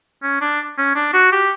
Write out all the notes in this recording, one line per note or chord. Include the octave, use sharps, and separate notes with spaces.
C#4
D4
C#4
D4
F#4
G4